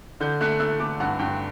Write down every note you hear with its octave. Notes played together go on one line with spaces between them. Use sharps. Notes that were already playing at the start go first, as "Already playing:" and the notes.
D3 G6
A3 F#6
A3 E6
A3 D6
G2 F#5
G2 G5